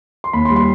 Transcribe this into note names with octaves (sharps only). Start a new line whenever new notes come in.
C6
D#2 B5
C6
G3
C6